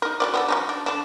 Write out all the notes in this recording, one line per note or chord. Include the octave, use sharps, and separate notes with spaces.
D#4 A#4
F#3 C4 D5
B3 G4 A4
F#3 C#4 D#4
D4
D3 D4